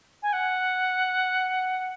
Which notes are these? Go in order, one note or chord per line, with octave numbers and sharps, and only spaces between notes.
G#5
F#5